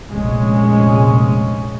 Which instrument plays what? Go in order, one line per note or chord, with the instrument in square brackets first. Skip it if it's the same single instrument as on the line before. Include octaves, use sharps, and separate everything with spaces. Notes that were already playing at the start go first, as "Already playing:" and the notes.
[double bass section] F1 A#1 G#3 C#4